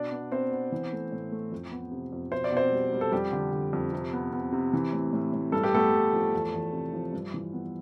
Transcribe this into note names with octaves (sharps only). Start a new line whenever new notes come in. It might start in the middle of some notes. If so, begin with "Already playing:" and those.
Already playing: B2 D4 D5
B3
B3 C4 C5
B3
E3
A3
A2
A3
F2
B3
C3
F2
B2 C5
D5
B2 C4 C5
G3
G3
A4
F2 G3 G4
D3
D3
F2
C3
B3
B3
C3
E3
A2
A2
A2
G2 A4
G4
A3 B3 A4
G2
F3
E2
E2
C3
F3
G2
E3
B3